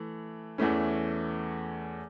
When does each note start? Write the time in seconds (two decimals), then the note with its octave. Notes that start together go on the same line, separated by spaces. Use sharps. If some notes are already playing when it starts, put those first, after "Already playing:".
Already playing: E3 A3
0.58 E2 E3 A3 C#4